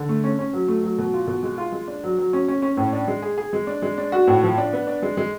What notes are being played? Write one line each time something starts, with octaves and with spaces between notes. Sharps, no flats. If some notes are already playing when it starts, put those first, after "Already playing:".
Already playing: D3
A3
C#4
C#4
F#3
A3
F#3
B2
F4
B2
G#3
F4
G#3
D4
F#3
F#3
C#4
C#4
C#4
A2
D4
G#3
G#4
G#4
G#3
D4
G#3
D4
F#4
A2
F3
D4
B3
D4
G#3
G#3